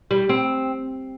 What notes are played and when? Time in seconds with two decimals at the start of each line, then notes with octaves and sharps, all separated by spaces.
0.11 G3
0.29 C4